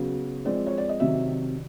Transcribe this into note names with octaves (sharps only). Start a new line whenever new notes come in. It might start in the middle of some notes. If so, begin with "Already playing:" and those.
Already playing: C#3 F#3 B3
F3 G#3 C4 D5
C#5
D5
D#5
C3 D#3 F#3 E5